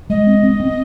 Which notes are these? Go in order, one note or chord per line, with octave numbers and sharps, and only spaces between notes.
G#3 D#5
C4
C4
C4